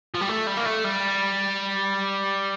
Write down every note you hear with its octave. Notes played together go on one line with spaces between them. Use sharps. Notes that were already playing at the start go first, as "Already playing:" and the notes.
F3
G3
A3
G3
A#3
A3
G3